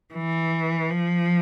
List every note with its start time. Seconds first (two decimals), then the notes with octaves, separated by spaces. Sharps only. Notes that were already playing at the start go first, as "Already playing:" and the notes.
0.14 E3
0.90 F3